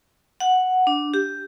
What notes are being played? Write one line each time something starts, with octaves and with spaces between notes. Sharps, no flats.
F#5
D4
G4